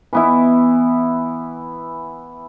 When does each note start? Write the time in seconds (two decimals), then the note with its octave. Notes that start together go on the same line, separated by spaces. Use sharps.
0.13 E3 B3 E4